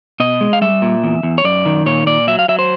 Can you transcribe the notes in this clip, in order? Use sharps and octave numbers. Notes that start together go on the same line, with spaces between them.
B2 D#5
G#3
F5
G3 E5
A#2
E2
E2
C#5
F#2 D5
D#3
A#2 C#5
A#2 D5
F#3 E5
F5
F#3 E5
C5